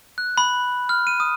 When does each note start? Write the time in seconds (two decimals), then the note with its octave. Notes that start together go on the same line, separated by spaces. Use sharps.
0.18 F#6
0.38 B5
0.89 F6
1.07 D#7
1.20 D#6